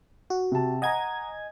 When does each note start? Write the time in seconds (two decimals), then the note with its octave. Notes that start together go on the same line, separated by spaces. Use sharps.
0.30 F#4
0.51 C3 A5
0.82 D#5 F#5 G#5 A#5 G#6